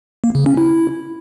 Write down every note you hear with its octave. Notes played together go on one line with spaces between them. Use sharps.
A#3
C#3
C#4
E4